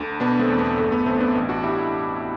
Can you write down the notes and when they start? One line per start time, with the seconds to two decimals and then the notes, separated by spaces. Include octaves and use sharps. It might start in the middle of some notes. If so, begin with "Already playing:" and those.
Already playing: D2 D3
0.20 B2 B3 D4
0.39 A3 C4
0.49 E2
0.59 B3
0.78 G1 A3
0.92 B3
1.06 G1 A3 C4
1.20 B3 D4
1.35 A1
1.49 D4 F#4
1.63 A1 E4 G4